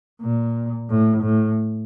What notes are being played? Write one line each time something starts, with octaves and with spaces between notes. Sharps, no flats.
A#2
A2
A2